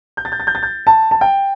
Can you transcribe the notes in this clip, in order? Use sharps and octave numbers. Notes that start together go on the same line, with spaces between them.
G6
A6
G6
A6
G6
A6
G6
A5
A5
G5